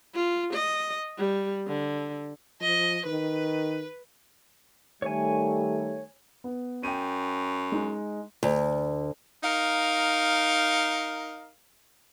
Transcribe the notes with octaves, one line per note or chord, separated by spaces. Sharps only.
F4
D#5
G3
D3
F3 D#5
D#3 B4
D#3 G3 A3 C#5 G#5
B3
F#2 G5 D#7
G#3 D#4
D2
D#4 A#4 F5